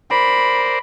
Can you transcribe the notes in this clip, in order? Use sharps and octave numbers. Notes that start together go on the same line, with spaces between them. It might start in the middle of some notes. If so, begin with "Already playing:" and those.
A#4 C5 D5 B5